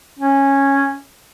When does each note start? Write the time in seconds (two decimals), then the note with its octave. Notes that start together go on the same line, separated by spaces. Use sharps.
0.19 C#4